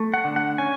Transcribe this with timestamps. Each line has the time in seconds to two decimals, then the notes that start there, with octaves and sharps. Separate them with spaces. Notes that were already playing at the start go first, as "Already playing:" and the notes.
Already playing: A3
0.14 F#5
0.24 D3
0.36 F#5
0.58 C#4 G#5